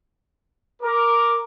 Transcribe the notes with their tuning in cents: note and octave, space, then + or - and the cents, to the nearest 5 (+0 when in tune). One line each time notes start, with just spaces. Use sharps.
A#4 +0 D6 +0